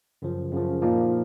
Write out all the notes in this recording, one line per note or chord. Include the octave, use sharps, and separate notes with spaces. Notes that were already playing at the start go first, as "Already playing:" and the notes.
F#2 C#3 F3
F#2 C#3 F3
A#2 F3 A#3 D#4